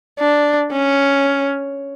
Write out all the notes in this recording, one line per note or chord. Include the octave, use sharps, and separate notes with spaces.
D4
C#4